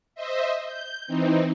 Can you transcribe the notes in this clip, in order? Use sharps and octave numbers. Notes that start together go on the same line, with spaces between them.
C5 D#5 E5
G6
E3 C4 D#4